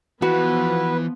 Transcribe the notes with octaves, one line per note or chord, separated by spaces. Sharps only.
E3 F3 B3 F#4 B4